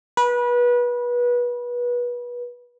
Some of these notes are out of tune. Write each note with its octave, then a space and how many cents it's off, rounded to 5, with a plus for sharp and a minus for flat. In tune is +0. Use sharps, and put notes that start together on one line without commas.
B4 -25